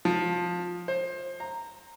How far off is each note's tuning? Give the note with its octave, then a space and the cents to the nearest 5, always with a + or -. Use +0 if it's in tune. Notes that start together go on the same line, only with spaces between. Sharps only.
F3 +15
C5 +25
A#5 -10